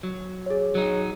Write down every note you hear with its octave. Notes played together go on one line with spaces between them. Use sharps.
F#3
G#4 C#5
F#3 D#4